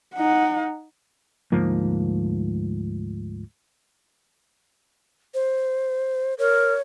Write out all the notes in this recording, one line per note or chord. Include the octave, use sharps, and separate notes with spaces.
D#4 F#5
D2 G#2 F3 A#3
C5
A#4 C#5